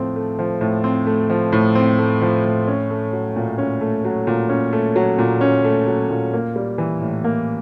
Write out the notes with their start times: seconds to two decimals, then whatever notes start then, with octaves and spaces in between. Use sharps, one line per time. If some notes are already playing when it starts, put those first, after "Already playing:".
Already playing: A2 F3 A3 C4
0.16 A3
0.39 F3
0.61 A2
0.84 C4
1.07 A3
1.30 F3
1.52 A2
1.75 C4
1.98 A3
2.22 F3
2.45 A2
2.67 C#4
2.90 A3
3.13 F#3
3.36 A#2
3.58 C#4
3.81 A3
4.05 F#3
4.27 A#2
4.49 C#4
4.73 A3
4.96 F#3
5.19 A#2
5.41 C#4
5.64 A3
5.87 F#3
6.10 A#2
6.33 A#3
6.56 G3
6.78 E3
7.01 A2
7.24 A#3